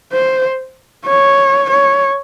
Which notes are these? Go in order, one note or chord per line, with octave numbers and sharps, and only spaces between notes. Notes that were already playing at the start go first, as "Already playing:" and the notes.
C5
C#5
C#5